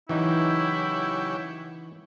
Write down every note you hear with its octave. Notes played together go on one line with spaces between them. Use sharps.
C#3 E3 F#3 D#4 E4 G4